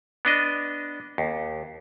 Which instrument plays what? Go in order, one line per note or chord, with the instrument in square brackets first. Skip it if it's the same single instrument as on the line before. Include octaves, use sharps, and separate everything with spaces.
[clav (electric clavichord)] B3 D4 D#5
D#2